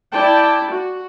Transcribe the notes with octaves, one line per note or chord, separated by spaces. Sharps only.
E4 D5 G5 A5
F#4